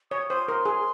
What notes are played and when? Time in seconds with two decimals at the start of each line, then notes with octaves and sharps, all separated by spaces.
0.11 C#5 D#6
0.30 C5 D#6
0.48 A#4 C6
0.65 G#4